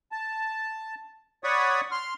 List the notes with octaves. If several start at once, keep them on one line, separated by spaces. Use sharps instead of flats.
A5
C#5 D5 F#5 B5 C#6 D#6
C6 F6